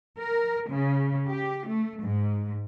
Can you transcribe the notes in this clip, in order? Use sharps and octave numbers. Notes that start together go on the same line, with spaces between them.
A#4
C#3
G4
A3
G#2